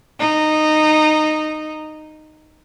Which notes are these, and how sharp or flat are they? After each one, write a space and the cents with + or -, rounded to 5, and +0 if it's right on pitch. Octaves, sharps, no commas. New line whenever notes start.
D#4 -15